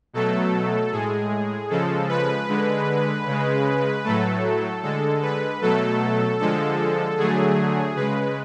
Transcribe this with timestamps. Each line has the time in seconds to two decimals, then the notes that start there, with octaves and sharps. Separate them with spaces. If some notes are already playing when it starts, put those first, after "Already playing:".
0.13 B2 F#3 A3 A4
0.92 A2 G#3 G#4
1.70 C#3 F3 G#3 A4
2.09 B4
2.48 D3 G#3
3.26 C#3 G#3
4.05 A2 F#3 A3 A4
4.83 D3 G#3 A4
5.23 B4
5.62 B2 F#3 A3 A4
6.39 D3 F3 G#3 A4
7.18 D3 F#3 A3 G#4
7.96 C#3 G#3 B4